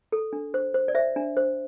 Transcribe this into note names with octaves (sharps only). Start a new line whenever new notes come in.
A4
D4
C5
C5
D5
C5 E5
D4
C5